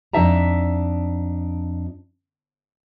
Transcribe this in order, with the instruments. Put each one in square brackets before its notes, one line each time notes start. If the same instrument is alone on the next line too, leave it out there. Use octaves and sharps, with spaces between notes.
[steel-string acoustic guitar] F2 D4 D#4 E5 A5 A#5